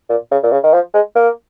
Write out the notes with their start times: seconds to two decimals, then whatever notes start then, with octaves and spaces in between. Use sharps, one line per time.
0.09 A#2
0.31 C#3
0.43 A#2
0.51 C#3
0.63 D#3
0.73 F3
0.94 G#3
1.15 A#3